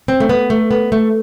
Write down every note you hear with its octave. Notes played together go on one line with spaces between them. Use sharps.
C4
A3
B3
A3
B3
A3